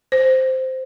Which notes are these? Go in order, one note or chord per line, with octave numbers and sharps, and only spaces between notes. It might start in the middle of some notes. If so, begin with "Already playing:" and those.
C5